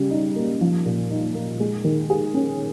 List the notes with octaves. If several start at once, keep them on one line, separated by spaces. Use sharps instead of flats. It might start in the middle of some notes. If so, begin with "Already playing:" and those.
Already playing: C#3 G3
D#4
A#3
F3
A#2
D#4
A#3
G#3
D#3
G#4
C#4